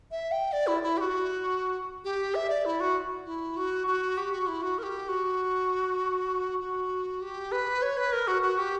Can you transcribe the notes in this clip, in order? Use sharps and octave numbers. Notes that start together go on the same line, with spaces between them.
E5
G5
D5
E4
E4
G4
F#4
G4
E5
D5
E4
F#4
E4
F#4
F#4
G4
F#4
E4
F#4
A#4
G4
F#4
F#4
G4
B4
C#5
B4
A#4
F#4
F#4
G4